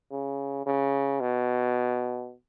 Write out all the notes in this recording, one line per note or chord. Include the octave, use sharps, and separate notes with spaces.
C#3
C#3
B2